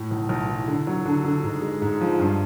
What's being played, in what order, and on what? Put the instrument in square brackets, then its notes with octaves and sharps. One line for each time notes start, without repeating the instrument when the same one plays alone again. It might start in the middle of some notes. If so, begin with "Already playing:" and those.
Already playing: [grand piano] A2
B1
B1
E3
D3
F#3
D3
D3
G#2
G#3
G#2
F3
G2